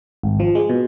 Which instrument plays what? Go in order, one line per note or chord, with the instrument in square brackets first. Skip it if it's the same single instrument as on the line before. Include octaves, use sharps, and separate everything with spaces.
[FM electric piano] G#1
F3
G#3
B2